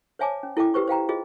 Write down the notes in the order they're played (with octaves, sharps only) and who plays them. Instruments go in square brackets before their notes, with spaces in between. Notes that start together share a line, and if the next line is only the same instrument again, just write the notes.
[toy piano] C5 C#5 E5 G#5 A5 D6
C#4
E4 A4 E5 G5 D6
G4 B4 C5 C#6
C5 F5 G5 A#5
F4 G#4 C5 D#5